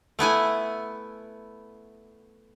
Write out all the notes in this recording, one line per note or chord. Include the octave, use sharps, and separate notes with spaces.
A3 B3 E4 G#5